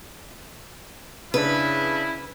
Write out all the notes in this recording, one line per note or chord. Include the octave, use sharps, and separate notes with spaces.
C#3 D4 E4 B4